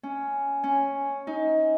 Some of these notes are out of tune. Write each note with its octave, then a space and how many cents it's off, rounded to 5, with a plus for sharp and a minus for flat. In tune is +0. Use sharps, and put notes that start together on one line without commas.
C#4 +5
C#4 +0
D#4 +25